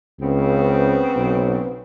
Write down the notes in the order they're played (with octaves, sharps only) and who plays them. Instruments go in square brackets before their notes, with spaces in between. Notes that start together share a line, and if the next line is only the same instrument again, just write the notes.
[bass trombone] C#2 [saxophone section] C#3 B3 C4
[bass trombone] B1